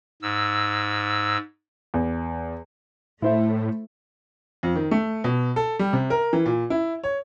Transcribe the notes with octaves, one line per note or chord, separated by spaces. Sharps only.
G#2 E6
E2
A2 A3 E4 C5 E5
F2
D#3
A3
B2
A4
G3
C3
A#4
E3
A#2
E4
C#5